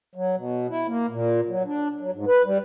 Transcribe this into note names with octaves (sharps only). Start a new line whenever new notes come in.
F#3
B2
E4
A#3
A#2
F#3
D4
F#3
G#2
B4
G3